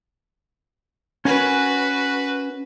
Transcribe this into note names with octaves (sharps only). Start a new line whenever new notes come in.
C#4 F#4 A#4 B4 G#5